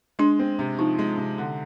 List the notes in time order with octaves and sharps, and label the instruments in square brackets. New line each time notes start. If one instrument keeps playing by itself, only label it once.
[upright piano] G#3 [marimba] D4
[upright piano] C4
C3
[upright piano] F3 [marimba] D#4
[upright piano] G#3
C3
D3